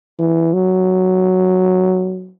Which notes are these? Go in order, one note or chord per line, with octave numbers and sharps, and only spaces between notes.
E3
F#3